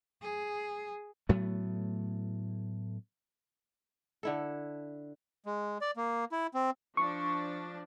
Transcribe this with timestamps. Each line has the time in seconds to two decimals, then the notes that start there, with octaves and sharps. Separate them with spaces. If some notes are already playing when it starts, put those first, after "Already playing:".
0.22 G#4
1.29 A2 F#3 A3 B3
4.23 D3 E4 A4
5.46 G#3
5.81 D5
5.97 A#3
6.32 E4
6.54 C4
6.97 F3 D4 C#6